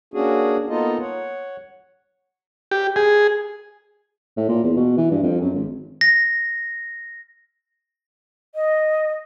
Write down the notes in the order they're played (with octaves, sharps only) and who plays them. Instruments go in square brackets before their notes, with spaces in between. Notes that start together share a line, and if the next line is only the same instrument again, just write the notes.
[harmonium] A#3 C#4 D4 F#4 G#4
A#3 B3 D#4 F4 A4 D#5
C#5 F#5
[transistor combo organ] G4
G#4
[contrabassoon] A2
A#2
E2
B2
E3
G2
F2
F#2
G#1
[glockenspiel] A#6
[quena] D#5